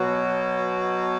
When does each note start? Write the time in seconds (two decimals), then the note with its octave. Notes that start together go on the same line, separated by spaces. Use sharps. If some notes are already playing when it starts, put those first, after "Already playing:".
Already playing: B2 F#3 F#4